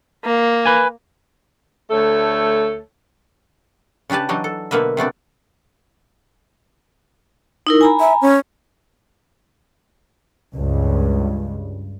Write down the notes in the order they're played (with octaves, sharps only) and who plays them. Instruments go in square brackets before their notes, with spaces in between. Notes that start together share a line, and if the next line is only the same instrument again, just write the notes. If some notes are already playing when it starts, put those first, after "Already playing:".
[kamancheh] A#3
[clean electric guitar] B4 G#5
[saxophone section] D2 A3 A4 C#5
[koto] C#3 D4 G4 B4 A5
E3 F#3 D4 D#4 D#5
A4
B2 D3 A#3 B4 E5
C3 A3 B3 D4
[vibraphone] D#4 E4 A#4
G#5 A#5 B5
[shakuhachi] E5
C#4
[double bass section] C#2 G2